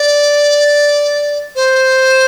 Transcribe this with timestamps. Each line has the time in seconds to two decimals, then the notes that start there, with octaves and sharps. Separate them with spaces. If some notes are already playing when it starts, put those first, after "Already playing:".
Already playing: D5
1.56 C5